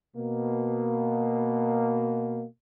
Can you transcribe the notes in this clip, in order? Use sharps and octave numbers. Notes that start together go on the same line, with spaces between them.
B2 A#3